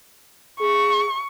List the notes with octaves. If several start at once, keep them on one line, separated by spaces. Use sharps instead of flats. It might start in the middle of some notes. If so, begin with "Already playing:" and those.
G#4 C#6